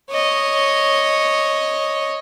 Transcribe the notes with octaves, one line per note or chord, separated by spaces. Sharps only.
C#5 D#5